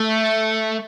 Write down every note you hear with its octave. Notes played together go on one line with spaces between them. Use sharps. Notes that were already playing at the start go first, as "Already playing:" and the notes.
Already playing: A3